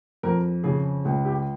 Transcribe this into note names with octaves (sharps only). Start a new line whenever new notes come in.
F2 A#4
C#3 G#4
C#2 G#4
G4